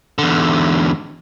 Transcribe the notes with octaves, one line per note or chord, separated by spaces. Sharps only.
E2 D3